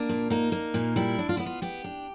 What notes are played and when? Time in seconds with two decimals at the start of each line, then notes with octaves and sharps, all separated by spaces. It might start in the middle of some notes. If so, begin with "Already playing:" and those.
Already playing: A#3 D4
0.09 A#2
0.30 A#3 D#4
0.52 A#3
0.74 A#2
0.96 G3 E4
1.19 D4
1.29 F4
1.37 B3 E4
1.46 F4
1.62 B3 G4
1.84 D4